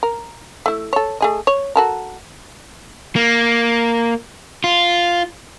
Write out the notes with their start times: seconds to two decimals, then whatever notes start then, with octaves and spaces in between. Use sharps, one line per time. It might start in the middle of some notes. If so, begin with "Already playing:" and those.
0.03 A#4
0.66 A3 E4
0.93 A4 C#5
1.21 A3 G#4 D#5
1.47 C#5
1.76 F#4 A4 A#4
3.16 A#3
4.64 F4